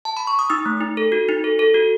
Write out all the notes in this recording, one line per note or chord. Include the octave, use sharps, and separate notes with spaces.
A5
B5
C#6
D#6
D#4 E6
A3
D#4
A4
F#4
D#4
A4
A4
F#4